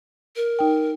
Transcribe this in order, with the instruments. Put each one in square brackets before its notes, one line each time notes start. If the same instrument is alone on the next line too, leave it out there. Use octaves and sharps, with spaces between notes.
[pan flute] A#4
[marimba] D#4 G5